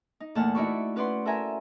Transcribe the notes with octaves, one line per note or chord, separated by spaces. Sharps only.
D#4
E2 A#2 A3 F#5 A5 F6
D#4 E4 F#4 D5 B5 C#6
C#4 B4 C#5 D5 F#5 C6
E4 A4 A#4 E5 G#5 A#5